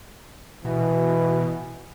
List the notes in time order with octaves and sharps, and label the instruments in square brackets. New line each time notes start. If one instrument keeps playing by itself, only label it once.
[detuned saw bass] B2 [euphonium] E3